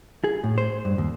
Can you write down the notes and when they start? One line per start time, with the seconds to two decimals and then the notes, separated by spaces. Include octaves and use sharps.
0.24 G#4
0.44 A2
0.58 C5
0.85 G2
0.98 D#2